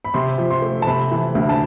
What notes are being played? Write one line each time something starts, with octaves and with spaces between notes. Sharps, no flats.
B5
C3 C6
F3
C6
A3
A5
C3 B5
E3
D2
A5